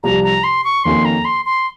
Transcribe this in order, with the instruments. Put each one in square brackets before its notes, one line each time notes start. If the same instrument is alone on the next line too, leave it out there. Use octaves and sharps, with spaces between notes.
[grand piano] C2 C3 F3 [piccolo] A#5
[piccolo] A#5
C6
C#6
[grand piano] F2 D#3 A#3 C#4 F#4 [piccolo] C6
[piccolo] A#5
C6
C6